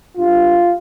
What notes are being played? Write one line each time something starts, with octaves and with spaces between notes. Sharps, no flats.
G2 F4